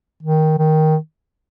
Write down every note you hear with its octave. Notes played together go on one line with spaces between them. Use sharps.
D#3
D#3